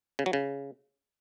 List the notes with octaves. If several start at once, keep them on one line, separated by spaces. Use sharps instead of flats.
C#3
F#3
C#3